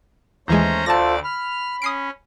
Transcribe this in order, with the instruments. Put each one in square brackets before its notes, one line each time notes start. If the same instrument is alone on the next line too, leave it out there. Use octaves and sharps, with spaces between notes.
[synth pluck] D#2 E3 G#3 [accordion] A3 [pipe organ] C#4 C5 A#5
[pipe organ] D2 D5 A6 [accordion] F4 A4 C5 [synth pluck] A5 A#6
[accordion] B5 [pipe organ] F6
[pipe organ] C#4 [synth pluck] D#6 C7 D7